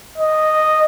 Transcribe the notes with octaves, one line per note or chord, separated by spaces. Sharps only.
D#5